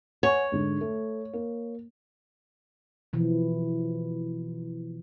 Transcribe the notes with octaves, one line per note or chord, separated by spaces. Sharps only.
C#5 F#5 G#5 C#6
G#2 D3
A3
A#3
B2 E3 F3